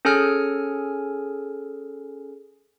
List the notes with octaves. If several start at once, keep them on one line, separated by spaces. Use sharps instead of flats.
C#4 G#4 A4 G#5 F6